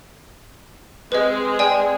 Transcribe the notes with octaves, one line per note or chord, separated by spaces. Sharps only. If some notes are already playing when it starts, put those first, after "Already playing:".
G#3 C4 G#4 B4 D#5
D5 G5 G#5